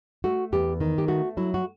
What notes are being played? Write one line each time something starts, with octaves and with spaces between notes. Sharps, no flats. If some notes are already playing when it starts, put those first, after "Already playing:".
A3 F#4
E2 G4
D#3
G4
A3 F#4
F#3 E4
F#4